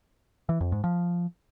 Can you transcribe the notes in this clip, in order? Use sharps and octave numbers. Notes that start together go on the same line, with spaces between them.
E3
F2
G#2
F3